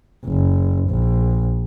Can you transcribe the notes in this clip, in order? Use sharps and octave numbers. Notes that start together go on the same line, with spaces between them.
F#1
A#1